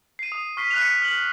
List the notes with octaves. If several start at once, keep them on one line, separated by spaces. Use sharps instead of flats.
C7 D#7
D#6
C#6 F6 B6 C7 D#7
F#6 B6 F7
C#7
F6 F#7